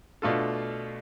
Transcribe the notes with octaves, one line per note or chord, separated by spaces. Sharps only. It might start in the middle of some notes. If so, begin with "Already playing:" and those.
B2 A3 D4 F4 A4